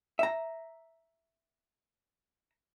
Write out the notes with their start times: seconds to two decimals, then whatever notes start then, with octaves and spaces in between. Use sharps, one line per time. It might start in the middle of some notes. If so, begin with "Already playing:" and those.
0.19 E5 A#5